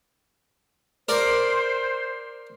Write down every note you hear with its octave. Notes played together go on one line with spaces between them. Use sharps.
A#4 C5 D5